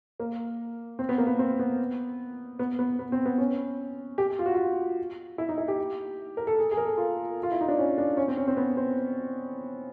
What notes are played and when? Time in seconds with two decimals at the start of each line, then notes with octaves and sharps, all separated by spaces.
0.20 A#3
0.99 C4
1.09 B3
1.18 A#3
1.27 B3
1.39 C4
1.59 B3
2.59 B3
2.79 B3
2.99 B3
3.12 C4
3.25 B3
3.38 C#4
4.18 G4
4.39 F4
4.46 F#4
4.54 F4
5.38 E4
5.49 D#4
5.58 E4
5.68 G4
6.37 A#4
6.47 A4
6.58 G#4
6.71 G#4
6.77 A#4
6.85 A4
6.98 F4
7.43 F4
7.52 E4
7.61 D#4
7.68 D4
7.78 C#4
7.98 D4
8.17 C#4
8.28 C4
8.37 C#4
8.48 C4
8.57 B3
8.77 C4